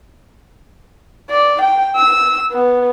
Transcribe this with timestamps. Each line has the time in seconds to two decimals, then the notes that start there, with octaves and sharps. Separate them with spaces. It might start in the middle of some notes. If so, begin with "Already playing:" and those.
1.30 D5
1.62 G5
1.96 E6
2.51 B3